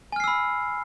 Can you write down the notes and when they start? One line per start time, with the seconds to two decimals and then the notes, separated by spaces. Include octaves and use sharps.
0.12 G#5
0.16 F6
0.20 C7
0.24 E6
0.28 B5